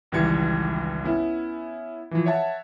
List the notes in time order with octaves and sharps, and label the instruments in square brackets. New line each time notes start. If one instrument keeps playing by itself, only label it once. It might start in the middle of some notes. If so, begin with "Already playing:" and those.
[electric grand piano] G#1 C#2 E3 G3 G#6 C#7
B3 C#4 E4
E3 F3
C#5 E5 F#5 A5